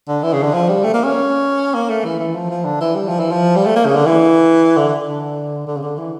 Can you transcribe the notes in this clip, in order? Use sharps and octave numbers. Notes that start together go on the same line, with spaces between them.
D3
E3
C#3
D3
F3
G3
A3
A#3
C#4
A#3
A3
E3
E3
F3
F3
D3
E3
G3
F3
E3
F3
G3
A3
A#3
C#3
D3
E3
D3
D3
D3
C#3
D3
E3